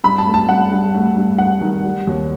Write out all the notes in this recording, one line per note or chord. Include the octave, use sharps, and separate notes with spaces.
G2 B5
A5
A3
A5
G2 F#5
G2
A3
G2
G2 F#5
D#3
G3
D#2